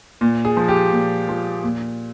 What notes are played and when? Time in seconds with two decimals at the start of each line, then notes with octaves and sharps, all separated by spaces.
0.21 A#2
0.45 G#4
0.57 F3
0.68 G4
0.92 A#2
1.29 F3
1.64 A#2